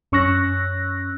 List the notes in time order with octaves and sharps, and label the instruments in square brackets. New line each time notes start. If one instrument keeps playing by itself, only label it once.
[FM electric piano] F#2 C#4 C#6 E6 F#6 A#6